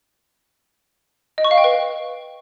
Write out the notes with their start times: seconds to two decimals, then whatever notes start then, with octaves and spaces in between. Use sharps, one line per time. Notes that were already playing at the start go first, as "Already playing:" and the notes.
1.38 D#5
1.44 C#6
1.51 F5
1.58 G5
1.64 B4